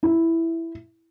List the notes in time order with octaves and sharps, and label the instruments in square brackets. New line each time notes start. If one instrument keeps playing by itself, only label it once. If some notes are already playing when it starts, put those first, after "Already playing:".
[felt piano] E4